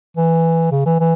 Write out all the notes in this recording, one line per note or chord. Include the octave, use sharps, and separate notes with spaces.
E3
C#3
E3
E3